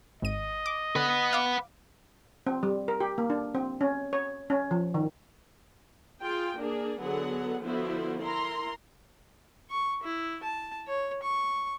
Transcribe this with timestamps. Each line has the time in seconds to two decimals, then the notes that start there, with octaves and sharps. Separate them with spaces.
0.22 G#1 D#5 D#7
0.66 D6
0.96 D3 B4 F#5
1.33 F5 D6
2.47 C4
2.63 G3
2.88 A#4
3.01 G4
3.18 A#3
3.30 D4
3.55 C4
3.81 C#4
4.13 C#5
4.50 C#4
4.71 F3
4.94 D#3
6.21 F4 G#4 G5
6.59 A#3 D4 G#4
7.01 D3 F#3 B3 G#4 A4 F#5
7.62 D3 F3 B3 E4 F#4 C5
8.23 E4 A#4 A#5 C6
9.70 C#6
10.03 E4
10.43 A5
10.88 C#5
11.23 C#6